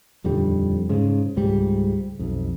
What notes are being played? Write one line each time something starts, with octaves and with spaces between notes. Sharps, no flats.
D#1 F2 D3 G3
G#2 C#3
C#2 G#2 G3
B1 F2